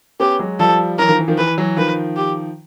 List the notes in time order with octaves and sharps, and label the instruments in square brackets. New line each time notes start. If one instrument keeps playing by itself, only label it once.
[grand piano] B3 C#4 [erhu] G4
[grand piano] F#3 G#3
[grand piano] F3 G3 [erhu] A4
[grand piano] E3 F#3 [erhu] A#4
[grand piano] D#3 F3
E3
D#3 F3
[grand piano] E3 [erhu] B4
[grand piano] E3 F#3
[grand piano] D#3 F3 [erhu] B4
[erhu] G4